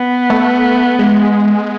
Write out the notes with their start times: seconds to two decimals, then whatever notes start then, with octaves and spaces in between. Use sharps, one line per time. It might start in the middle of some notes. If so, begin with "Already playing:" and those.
Already playing: B3
0.30 A3
0.99 G#3